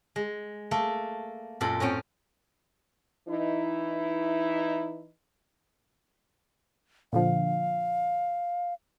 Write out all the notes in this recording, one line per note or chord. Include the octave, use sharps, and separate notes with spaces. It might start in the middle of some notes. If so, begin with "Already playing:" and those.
G#3
A3 A#3 A4
F#2 A#2 A4 B5 C6
A2 C4 C#4 G5
E3 D#4 E4
A#2 D3 F3 F5